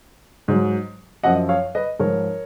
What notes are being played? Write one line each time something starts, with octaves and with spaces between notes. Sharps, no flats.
G#2 F#3
F#2 F3 D#5 F#5
C#5 F5
B4 D#5
G#2 F3 A#4 C#5